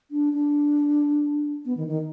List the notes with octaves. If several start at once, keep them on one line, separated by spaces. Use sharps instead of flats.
D4
D4
B3
D#3
D#3